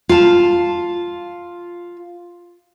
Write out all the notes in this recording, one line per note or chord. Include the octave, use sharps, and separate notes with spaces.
F4 A5